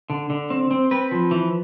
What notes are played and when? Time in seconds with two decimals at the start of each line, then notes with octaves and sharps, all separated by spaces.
0.10 D3
0.30 D3
0.50 C4
0.71 C4
0.91 C4 B4
1.11 F3
1.31 E3